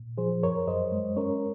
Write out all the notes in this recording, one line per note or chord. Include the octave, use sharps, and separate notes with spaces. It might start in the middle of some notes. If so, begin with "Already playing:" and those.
Already playing: A#2
F3 G#4 C5
F#2 A#4 C#5
F#2 C5 D#5
G#3
C#4 A#4 C#5